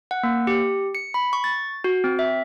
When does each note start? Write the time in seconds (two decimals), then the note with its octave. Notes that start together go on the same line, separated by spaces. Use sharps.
0.11 F#5
0.23 A#3
0.47 G4
0.95 C#7
1.14 B5
1.33 C#6
1.44 A6
1.84 F#4
2.04 C4
2.19 E5